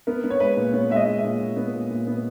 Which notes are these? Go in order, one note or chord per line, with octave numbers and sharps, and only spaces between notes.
B3 A#4
B3
C#5
G#3 B4
A#2
B3 C#5
G#3 E5
D#5
G#3
E5
A#2
A#2
B3
A#2
A#2
B3